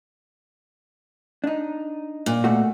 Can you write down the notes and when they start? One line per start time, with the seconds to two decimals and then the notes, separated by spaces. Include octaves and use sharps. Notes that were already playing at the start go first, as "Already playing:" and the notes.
1.44 D4 D#4
2.26 A#2
2.44 B2 A3 F#4